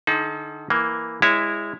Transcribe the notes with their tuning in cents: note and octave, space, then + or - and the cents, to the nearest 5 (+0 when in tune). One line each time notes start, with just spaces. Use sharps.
D3 +40 D#4 +25 A4 -45
E3 +0 A#3 +0
G#3 -20 E4 +0 C#5 +0